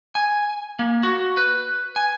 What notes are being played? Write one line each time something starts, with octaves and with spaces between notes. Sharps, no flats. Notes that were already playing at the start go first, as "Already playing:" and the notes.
G#5
A#3
F#4
B4
G#5